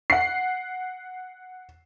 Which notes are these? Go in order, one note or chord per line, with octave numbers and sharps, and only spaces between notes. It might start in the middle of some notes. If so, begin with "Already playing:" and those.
F#5 C7